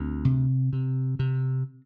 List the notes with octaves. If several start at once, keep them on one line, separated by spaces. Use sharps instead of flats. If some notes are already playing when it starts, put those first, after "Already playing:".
Already playing: D2 C4
C3
C3
C3